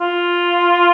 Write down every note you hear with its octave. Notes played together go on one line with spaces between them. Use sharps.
F4